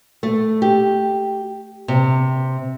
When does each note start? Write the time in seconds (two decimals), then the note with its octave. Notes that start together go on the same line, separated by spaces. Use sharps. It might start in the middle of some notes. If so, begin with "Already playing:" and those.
0.23 A3
0.62 G4
1.88 C3